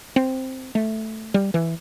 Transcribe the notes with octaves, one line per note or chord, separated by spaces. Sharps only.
C4
A3
G3
E3